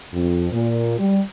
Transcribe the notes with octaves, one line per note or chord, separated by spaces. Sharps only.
F2
A#2
G3